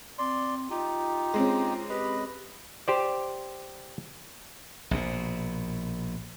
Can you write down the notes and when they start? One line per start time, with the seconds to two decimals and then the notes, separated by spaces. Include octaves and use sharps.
0.19 C4 D5 C6
0.70 D#4 F4 G4
1.34 G#3 C4 C#4
1.90 G4 B4 D#5 B5
2.88 G4 C5 D5
4.91 A#1 B2